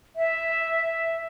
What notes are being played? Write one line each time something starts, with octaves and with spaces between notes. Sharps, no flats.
E5